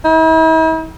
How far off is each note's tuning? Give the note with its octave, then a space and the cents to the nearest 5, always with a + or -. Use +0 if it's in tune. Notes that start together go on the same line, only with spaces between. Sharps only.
E4 -45